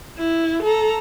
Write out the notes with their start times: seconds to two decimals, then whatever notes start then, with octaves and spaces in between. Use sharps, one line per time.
0.18 E4
0.63 A4 A#5